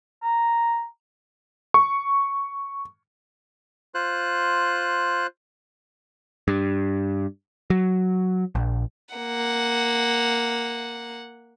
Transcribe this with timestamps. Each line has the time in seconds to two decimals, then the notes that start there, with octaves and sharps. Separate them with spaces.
0.23 A#5
1.74 C#6
3.94 F4 C5 F#6
6.48 G2
7.70 F#3
8.55 A#1
9.15 A#3 F#5